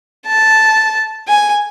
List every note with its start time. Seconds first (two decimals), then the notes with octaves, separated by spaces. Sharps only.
0.27 A5
1.28 G#5